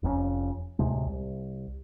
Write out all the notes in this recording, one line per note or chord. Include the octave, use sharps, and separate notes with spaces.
F1 F2 A2 C#4
D2 A2 C3 G#3
C2